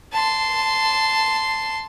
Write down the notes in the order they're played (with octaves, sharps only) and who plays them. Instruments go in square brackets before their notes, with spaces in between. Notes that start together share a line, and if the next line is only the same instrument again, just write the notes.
[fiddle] A5 C6